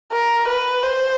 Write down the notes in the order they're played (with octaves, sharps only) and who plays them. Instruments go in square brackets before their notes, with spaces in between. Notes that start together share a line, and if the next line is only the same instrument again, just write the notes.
[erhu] A#4
B4
C5